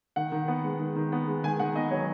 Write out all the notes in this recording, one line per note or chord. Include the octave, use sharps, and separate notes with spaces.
D#3 F#5
D#3
B3
G#3
D#3
D#3
B3
G#3
D#3 G#5
D#3 F#5
B3 D#5
F#3 C#5